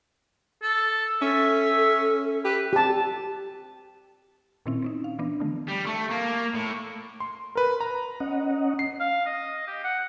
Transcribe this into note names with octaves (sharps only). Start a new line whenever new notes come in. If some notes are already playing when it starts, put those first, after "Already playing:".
A4
C#4 A4 E5
G4 B4
G4 A5
A#2 D#3 C4 C#4 E4
C4 C#4 D#4
F5
E3 B3 D4
D3 D#3 F3 A3
G3
A3
A#3
A2
C6
A#4 B4
A#5
C#4 D#5 F#5
C7
F5
D#5
G4
F#5